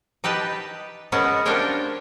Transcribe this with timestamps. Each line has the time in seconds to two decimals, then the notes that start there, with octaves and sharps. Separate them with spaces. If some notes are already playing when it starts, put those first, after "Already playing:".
0.24 D#4 G4 B4 A5
1.12 G#3 B3 C#4 A#4 F#5 A5
1.45 D4 F4 G4 A#4 C5 C#5